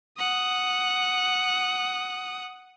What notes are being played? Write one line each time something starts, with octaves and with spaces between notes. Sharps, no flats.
F#5 D#6